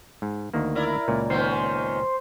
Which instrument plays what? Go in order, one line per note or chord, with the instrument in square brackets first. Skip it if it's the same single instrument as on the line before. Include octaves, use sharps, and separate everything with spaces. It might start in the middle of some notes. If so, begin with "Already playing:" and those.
[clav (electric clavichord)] G#2
D2 D#3 A#3
[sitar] E4 A#4 D5
[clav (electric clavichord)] C#2 A#2
[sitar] D#3 B3 C#4 [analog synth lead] C5